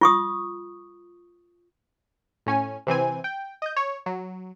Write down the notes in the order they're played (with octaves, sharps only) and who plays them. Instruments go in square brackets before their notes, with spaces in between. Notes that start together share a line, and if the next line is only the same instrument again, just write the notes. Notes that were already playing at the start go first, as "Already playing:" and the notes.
[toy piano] F4 C#6 D#6
[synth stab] A2 C#4 G#5
C3 E3 C4 G#5
G5
D#5 G6
C#5
F#3